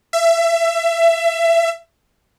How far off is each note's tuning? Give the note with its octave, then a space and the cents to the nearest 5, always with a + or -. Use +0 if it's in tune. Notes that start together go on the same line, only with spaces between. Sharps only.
E5 +25